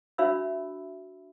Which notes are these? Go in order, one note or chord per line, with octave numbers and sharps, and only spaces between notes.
D4 F#4 C#5 E5 B5 E6